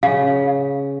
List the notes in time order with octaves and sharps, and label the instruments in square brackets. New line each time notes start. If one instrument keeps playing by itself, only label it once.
[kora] C#3 [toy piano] F5